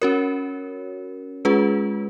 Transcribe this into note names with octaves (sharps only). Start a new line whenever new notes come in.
C#4 F#4 A#4 C#5
G#3 C#4 F4 G#4 B4